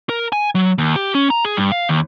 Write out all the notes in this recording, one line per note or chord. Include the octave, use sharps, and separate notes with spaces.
A#4
G#5
F#3
D#2
G4
C#4
A#5
G#4
G2
F5
D#2